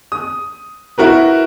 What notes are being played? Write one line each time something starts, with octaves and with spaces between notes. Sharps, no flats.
D#6
E4 F#4 A#4 B4